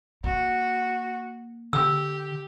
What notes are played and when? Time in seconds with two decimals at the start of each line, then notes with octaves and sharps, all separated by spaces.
0.24 A#3 F#4
1.73 D3 G4 E6